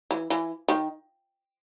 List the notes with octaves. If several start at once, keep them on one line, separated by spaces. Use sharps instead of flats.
E3
E3
D#3